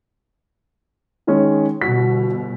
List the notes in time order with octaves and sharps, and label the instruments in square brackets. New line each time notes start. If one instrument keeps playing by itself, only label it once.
[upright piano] D#3 G#3 C#4
[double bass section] G1 B2 [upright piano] F#4 B6